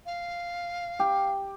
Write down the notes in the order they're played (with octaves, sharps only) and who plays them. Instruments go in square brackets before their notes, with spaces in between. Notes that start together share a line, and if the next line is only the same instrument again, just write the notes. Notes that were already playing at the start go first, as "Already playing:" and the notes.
[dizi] F5
[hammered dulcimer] G4